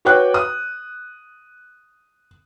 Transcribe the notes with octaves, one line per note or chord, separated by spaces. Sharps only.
F#4 B4 C#5 G5 D6 F#6
D#6